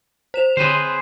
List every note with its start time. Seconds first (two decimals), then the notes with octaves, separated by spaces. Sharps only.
0.34 C5 E7 F7
0.57 D3 G#4 B4 C5 C6